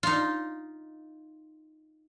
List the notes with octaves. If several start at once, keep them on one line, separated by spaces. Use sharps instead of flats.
D#4 F4